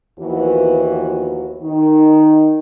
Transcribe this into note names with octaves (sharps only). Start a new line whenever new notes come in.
D#2 E3 F3 B3 F#4
D#3 D#4